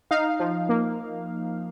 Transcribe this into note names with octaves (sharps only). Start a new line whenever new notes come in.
D#4 F5
F3
A#3